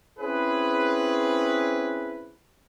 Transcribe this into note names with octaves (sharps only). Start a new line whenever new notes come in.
C4 C#4 E4 G#4 B4